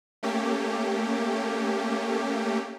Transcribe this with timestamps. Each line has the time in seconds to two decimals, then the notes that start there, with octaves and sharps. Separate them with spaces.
0.23 A3 A#3 C#4 G4